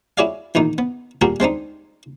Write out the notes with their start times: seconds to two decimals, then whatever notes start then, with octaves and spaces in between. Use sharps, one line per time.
0.17 E4 F#4 G#4 C#5 D5 F5
0.55 E2 A#2 D#3 D#4
0.78 B3
1.21 A#2 D3 G3 F#4 G#4 A#4
1.40 G#3 C4 D4 D#4